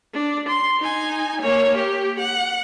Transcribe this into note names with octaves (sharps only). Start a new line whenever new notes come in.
D4
C6
D#4 G#5
A#3 C#5
G4
F#5